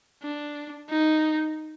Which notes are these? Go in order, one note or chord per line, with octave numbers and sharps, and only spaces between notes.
D4
D#4